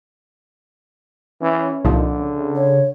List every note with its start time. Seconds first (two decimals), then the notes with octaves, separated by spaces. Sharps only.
1.42 E3 C#4
1.85 C2 A#2 D3 F3 D#4
2.19 C#3
2.55 C#5